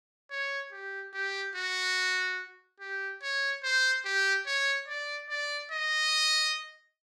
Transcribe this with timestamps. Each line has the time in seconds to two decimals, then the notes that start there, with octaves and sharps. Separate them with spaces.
0.31 C#5
0.72 G4
1.14 G4
1.55 F#4
2.80 G4
3.22 C#5
3.63 C5
4.05 G4
4.46 C#5
4.88 D5
5.29 D5
5.71 D#5